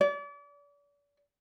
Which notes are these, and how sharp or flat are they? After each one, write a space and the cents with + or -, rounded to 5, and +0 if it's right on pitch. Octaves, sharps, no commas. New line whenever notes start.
D5 -40